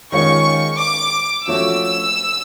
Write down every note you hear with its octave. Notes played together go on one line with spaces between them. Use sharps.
D#3 G#3 C#4 F4 C#6
D6
F3 A3 C#4 F#4 E6